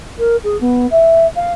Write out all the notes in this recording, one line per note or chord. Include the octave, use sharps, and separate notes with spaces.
A#4
G#4
B3
E5
F5